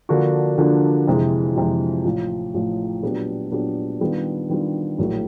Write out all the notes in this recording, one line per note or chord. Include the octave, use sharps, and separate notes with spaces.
D3 F3 A#3 D4 F#4
D3 F3 A#3 D4 F#4
F2 C3 E3 G#3
F2 C3 E3 G#3
A1 A2 F3
A1 A2 F3
A#2 F#3 B3 D4 G4
A#2 F#3 B3 D4 G4
D#3 G3 B3 D4 F4
D#3 G3 B3 D4 F4
A#1 A2 F#3 A#3